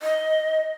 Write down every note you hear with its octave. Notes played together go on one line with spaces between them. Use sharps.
D#5